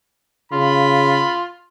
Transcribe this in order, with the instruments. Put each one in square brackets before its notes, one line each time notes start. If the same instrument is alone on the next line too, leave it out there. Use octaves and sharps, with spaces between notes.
[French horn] C#3 [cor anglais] F4 [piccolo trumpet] B5